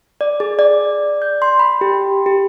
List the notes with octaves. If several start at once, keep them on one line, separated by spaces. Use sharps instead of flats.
D5
G#4
D5
G6
C6
B5
G4
G4